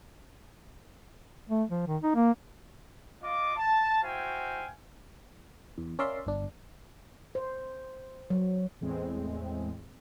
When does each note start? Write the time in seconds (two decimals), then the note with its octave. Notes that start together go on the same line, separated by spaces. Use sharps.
1.50 A3
1.69 F3
1.87 D#3
2.03 D#4
2.15 A#3
3.23 F4 D#5 D6
3.57 A5
4.03 E4 F#4 C5 F5 G5 G#5
5.78 E2
5.99 C#4 A#4 D5 E5 F5 C6
6.26 G1 D4
7.35 C5
8.30 F#3
8.81 E2 A2 G#3 C4